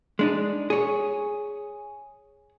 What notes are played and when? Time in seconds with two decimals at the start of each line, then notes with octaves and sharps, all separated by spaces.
0.19 G#3 D4 D#4
0.70 G#4 C#5